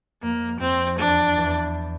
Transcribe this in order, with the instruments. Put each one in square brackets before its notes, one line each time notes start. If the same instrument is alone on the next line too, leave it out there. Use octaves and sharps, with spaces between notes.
[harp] F2 [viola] A#3
[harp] F2 [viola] C4
[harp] E2 [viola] D4
[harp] E2